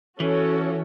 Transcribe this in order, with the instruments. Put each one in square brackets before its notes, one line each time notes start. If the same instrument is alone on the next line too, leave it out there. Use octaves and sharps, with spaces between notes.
[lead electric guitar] E3 [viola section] C#4 F#4 A4 C#5